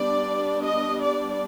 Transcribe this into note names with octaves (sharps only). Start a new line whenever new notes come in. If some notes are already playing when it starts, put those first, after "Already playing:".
Already playing: G3 B3 D4 D5
D#5
D5